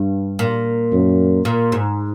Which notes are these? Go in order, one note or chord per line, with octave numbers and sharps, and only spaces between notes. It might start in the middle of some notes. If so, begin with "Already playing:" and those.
Already playing: G2
A#2
F#2
A#2
G#2